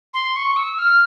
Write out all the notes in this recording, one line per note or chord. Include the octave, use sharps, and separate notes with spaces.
C6
C#6
E6
F6